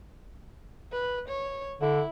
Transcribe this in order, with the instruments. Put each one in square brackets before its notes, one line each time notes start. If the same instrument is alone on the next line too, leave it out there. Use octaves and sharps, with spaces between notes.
[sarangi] B4
C#5
[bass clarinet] D3 [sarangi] E4